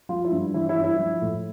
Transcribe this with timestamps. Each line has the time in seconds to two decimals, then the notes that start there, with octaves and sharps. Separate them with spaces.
0.09 F3 F4
0.25 E4
0.31 G2
0.54 E3 E4
0.69 E4
0.77 G2
0.84 E4
0.99 F3
1.22 A2